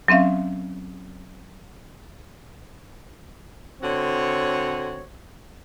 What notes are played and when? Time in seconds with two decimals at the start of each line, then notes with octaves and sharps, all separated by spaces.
0.08 F#3 C4 C#4 E5 F5
3.82 D3 C4 F#4 C#5